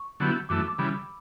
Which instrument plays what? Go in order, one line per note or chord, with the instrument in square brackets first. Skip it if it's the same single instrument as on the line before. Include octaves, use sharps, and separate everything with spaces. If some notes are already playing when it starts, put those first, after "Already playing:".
Already playing: [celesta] C#6
[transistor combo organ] D3 F#3 B3 E4 G4
[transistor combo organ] F#2 E3 A3 [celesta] D6
[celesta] E6
D6
[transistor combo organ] C#3 E3 G3 [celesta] B5